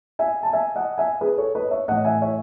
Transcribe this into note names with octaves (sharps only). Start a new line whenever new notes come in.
E5 G#5
A5
E5 G#5
D#5 F#5
E5 G#5
G#4 B4
A4 C#5
B4 D#5
C#5 E5
A2 E3 D#5 F#5
E5 G#5
C#5 E5